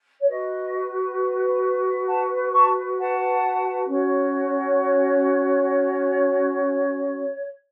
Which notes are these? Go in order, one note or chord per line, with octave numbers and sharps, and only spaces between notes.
C#5
F#4 B4 D#5
F#5 A5
A5 C#6
F#5 A5
C#4 F#4 C#5